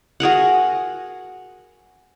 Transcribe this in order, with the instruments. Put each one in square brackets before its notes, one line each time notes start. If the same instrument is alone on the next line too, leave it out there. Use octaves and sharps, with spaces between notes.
[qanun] F#4 G#4 A#4 F#5